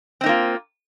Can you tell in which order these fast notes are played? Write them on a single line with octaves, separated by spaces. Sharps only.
C4 D#4 A#3 F4